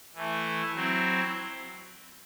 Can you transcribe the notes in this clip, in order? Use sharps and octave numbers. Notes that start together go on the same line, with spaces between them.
E3 A3 E4
F#3 C4 E4